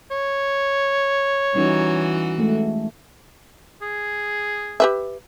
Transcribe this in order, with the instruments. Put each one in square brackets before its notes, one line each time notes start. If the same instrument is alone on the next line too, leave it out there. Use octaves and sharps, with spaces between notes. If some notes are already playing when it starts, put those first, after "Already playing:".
[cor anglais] C#5
[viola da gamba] E3 F#4 [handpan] G3 C#4 D#4
[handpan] G#3 A3
[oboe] G#4
[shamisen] G4 B4 E5